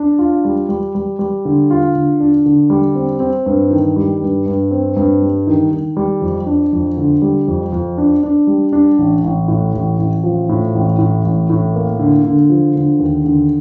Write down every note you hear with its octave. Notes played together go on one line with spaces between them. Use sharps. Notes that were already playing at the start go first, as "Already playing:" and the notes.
Already playing: D4
F4
G3
G3
G3
G3
D3
F4
D3
D4
D3
G3
C4
C4
G2
D#3
G3
G2
G2
C4
G2
G3
D#3
D#3
G3
F2
D4
F2
D3
G3
F2
F2
D4
D4
G3
D4
A1
A1
A2
A1
A1
F3
A2
A1
A2
A1
A2
A#3
D3
D3
F3
D3
D#2
D3